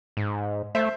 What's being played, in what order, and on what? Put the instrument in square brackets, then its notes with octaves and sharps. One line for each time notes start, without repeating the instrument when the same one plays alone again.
[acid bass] G#2
[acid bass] A3 [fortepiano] C5 E5